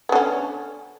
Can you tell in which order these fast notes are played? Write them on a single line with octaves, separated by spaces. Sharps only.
B3 D3 C#4